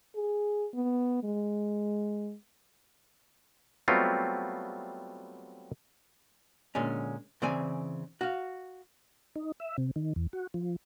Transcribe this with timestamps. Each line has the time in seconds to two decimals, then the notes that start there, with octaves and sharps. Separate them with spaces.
0.15 G#4
0.74 B3
1.23 G#3
3.88 F#3 G3 A3 B3 C4 F4
6.75 A#2 D3 G#3 C#4
7.42 C#3 E3 C4 D5 G#5
8.21 F#4 F5
9.36 D#4
9.60 E5
9.78 C3
9.96 D#3
10.16 E2
10.33 F#4
10.54 F3